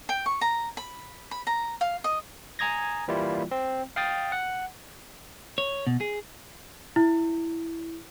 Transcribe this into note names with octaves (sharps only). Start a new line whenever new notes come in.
G5
C#6
A#5
B5
B5
A#5
F5
D#5
G#5 A#5 D#6 G#6 A#6
E3 G3 A#3 E4 F4
C4
F5 G5 D#6 A6
F#5
C#5
B2
G#4
E4